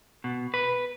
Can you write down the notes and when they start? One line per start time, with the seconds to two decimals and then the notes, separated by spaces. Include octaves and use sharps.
0.24 B2
0.54 B4